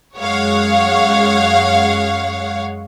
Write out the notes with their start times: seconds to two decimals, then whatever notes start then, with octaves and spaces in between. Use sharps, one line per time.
0.17 F#2 G#3 C#5 F5 F#5